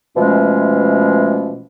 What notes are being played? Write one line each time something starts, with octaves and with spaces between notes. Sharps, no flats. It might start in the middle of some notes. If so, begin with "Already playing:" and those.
B2 E3 F3 G#3 A3 C#4